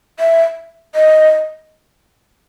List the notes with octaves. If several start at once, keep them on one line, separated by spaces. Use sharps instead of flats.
E5
D#5